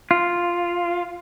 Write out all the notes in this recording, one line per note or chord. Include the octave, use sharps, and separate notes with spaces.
F4